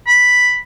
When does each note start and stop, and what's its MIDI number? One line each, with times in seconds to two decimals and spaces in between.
0.07 0.56 83